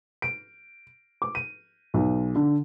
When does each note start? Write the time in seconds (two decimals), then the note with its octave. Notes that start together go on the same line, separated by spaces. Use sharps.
0.22 D7
1.22 D6
1.35 D#7
1.94 B1
2.36 D3